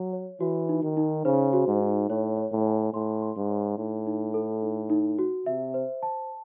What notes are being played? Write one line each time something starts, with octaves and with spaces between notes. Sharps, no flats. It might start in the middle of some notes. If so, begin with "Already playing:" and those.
Already playing: F#3
C#5
E3 F#4
D#4
D#3
D#4
C#3 C5
F#4
G#2
D#4
A2 C#5
C#5
A2
G#5
A2 C6
C6
G#2
C#5
A2 D#4
D#4
A4
D#4
D#4
F#4
C3 E5
C5
A5